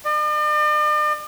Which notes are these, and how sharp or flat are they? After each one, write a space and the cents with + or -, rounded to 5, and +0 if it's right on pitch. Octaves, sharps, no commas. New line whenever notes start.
D5 +45